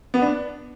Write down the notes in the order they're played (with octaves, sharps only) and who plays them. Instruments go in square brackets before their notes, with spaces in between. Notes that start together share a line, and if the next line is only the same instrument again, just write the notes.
[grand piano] B3
D4